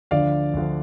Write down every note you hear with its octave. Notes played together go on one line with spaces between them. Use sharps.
D2 D3 F3 D5 F5
D2 D3 F3